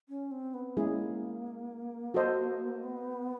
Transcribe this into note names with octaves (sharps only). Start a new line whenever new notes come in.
C#4
C4
B3
G#3 A#3 C#4 E4 G#4
F#4 A4 C5 D#5
B3